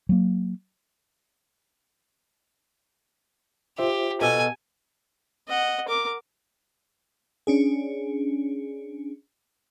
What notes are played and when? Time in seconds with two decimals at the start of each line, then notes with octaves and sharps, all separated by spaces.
0.09 F#3 A#3
3.78 F4 G4 C5 E5
4.21 B2 A4 G#5
5.48 D#5 F#5
5.88 A#4 D6
7.47 C#4 D4 G#4